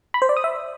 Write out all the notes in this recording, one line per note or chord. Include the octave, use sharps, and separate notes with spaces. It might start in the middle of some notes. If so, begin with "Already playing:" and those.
B5
C5
D5
D#6
E5